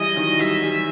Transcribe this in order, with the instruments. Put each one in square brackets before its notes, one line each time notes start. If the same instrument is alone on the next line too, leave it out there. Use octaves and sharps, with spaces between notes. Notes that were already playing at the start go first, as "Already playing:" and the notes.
Already playing: [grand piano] E3 G3 [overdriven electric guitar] D#5
[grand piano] D#3 F#3
[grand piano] E3 G3 [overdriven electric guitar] E5
[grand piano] E3 G3